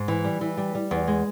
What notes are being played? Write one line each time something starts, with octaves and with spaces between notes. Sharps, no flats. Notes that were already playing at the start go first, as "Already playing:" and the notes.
Already playing: G#2
E3
G3
E3
G3
G3
E2
G#3